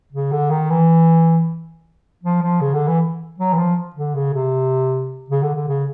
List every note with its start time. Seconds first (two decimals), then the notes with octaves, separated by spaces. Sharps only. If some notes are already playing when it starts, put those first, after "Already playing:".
0.12 C#3
0.32 D3
0.50 D#3
0.70 E3
2.23 F3
2.43 F3
2.61 C#3
2.74 D3
2.87 E3
3.38 F#3
3.53 E3
3.58 F3
3.95 D3
4.15 C#3
4.34 C3
5.30 C#3
5.43 D3
5.55 D3
5.68 C#3